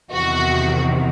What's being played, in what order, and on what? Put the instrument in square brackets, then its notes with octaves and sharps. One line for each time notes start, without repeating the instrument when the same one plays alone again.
[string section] E2 C3 D#3 F#4